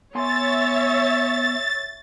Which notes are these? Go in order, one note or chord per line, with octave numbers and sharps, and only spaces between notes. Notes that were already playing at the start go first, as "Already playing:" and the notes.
B3 C#5 E5 G#5 C6 A6